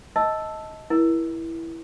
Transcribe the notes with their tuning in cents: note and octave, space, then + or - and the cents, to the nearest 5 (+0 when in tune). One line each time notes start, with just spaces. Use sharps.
D#5 +20 A5 +0 E6 +0
E4 +0 A#4 +35